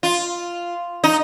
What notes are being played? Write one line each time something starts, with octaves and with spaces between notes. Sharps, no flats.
F4
D#4